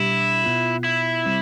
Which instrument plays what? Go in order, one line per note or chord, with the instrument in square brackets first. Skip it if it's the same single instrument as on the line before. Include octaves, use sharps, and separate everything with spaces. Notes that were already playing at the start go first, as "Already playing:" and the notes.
Already playing: [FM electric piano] B2 G3 D4 G4 [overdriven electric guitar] E4
[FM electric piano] B2 B3 F4
[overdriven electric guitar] E4
[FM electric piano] C3 G3 C4